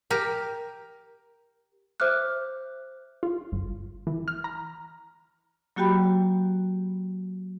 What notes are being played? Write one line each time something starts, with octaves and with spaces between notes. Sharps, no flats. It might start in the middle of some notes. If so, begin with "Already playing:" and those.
G4 A#4
C5 E5 D6 F6 F#6
F4
G1
E3
F6
A#5
F#3 A#3 F#4 G4 G5 B5